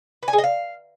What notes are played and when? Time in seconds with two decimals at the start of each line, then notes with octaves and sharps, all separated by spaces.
0.23 B4
0.28 G#5
0.33 G#4
0.38 D#5
0.44 F5